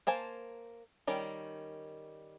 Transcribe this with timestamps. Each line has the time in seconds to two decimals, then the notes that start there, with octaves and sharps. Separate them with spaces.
0.07 A#3 C5 G#5 A5
1.07 D#3 G3 C#4